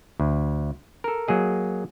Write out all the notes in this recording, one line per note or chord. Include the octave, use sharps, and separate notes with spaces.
D2
A4 A#4
F#3 A#3 G#4 D#5